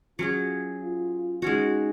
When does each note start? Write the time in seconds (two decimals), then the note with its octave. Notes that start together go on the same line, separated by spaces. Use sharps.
0.18 F#3 C#4 F4 G#4
0.81 F4
1.42 G#3 C#4 D#4 F#4